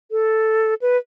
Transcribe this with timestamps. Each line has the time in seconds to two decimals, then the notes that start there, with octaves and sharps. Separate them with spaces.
0.11 A4
0.82 B4